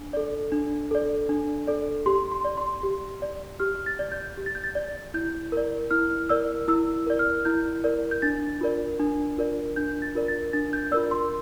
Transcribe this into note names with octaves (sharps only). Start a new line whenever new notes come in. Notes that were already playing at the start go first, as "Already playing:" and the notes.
Already playing: D4
A4 D5
D4
A4 D5
D4
A4 D5
G4 C6
C6
D5
C6
G4
D5
G4 F6
A6
D5
G6
G4
A6
G6
A6
D5
E4 G6
A#4 D5
E4 F6
A#4 D5 E6
E4 E6
A#4 D5
F6
E4 G6
A#4 D5
G6
D4 A6
F4 A#4 D5
D4
F4 A#4 D5
D4 G6
A6
F4 A#4 D5
A6
D4 A6
G6
F4 A#4 D5 E6
C6